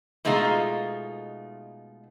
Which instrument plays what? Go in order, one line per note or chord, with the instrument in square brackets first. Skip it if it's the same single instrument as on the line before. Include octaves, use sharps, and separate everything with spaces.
[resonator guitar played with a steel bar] B2 G#3 A3 D#4 F4